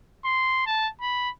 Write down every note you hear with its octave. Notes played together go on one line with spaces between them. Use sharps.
C6
A5
B5